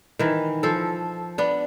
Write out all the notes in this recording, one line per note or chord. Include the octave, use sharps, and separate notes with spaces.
D#3 E3
F3 A4
B3 D4